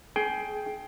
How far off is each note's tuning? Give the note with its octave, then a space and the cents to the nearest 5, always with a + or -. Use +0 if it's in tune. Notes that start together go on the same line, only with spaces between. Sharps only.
G#4 +20 G5 +0